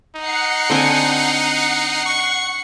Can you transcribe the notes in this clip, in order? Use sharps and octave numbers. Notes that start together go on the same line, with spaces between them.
D#4 F#5 C7 C#7
D3 C4 G#5
C#6